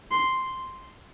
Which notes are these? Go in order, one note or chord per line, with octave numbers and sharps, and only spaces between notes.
C6